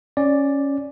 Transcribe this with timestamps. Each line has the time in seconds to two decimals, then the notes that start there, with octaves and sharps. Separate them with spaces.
0.17 C#4 D5